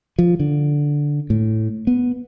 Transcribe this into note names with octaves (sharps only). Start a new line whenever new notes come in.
F3
D3
A2
B3